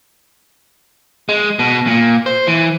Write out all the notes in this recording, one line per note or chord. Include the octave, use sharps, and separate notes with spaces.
G#3
B2
A#2
C5
E3